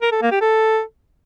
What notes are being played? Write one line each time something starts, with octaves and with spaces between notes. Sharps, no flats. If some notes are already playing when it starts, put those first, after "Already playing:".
A#4
A4
A#3
G4
A4